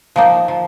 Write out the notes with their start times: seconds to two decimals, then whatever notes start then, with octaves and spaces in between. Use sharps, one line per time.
0.16 F3 A#3 D#4
0.48 F3